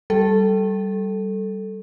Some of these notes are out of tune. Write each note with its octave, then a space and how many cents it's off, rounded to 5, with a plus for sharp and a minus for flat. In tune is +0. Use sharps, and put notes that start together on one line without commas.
G3 -15 A4 +0